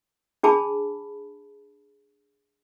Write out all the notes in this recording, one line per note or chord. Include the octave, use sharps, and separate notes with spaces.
D4 G#4 A5 B5